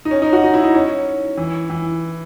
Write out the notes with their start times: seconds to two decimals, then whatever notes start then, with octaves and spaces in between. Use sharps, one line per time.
0.05 D#4
0.11 C#4
0.22 D#4
0.33 F#4
0.43 D#4
0.54 E4
0.64 D#4
0.74 C#4
1.37 E3
1.70 E3